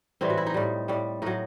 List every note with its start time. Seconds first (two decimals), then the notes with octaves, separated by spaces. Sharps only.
0.21 A2 E3 G3 C4
0.30 F#4
0.37 E4
0.47 D#4
0.54 A2 G3
0.88 A2 G3
1.22 A2 F#3 D#4